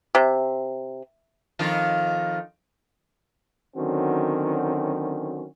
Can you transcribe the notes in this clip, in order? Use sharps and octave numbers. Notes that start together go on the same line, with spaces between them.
C3
F2 D#3 F4
D3 D#3 F#3 C4 C#4 F#4